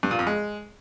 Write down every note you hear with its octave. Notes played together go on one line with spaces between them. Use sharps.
G2
A#2
F2
G#3